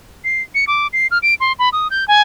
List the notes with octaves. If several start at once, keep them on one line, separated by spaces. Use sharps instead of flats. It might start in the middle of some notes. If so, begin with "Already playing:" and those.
C7
C#7
D6
C7
F6
D7
C6
B5
D#6
G6
G#5